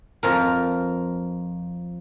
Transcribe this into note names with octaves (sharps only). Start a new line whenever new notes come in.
F2 F3 A#4